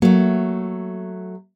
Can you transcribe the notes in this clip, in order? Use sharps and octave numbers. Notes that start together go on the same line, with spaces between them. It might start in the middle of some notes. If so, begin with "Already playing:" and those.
F#3 A3 A#3